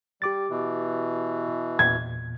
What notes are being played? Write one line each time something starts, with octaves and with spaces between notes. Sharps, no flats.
G3 G4 D6 A6
B2 E3
E2 A#2 G#6